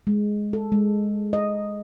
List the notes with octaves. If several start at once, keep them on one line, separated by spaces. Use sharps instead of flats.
G#3
A4
G#3
D#5